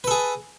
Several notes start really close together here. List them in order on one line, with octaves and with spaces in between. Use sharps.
B4 A4 G#4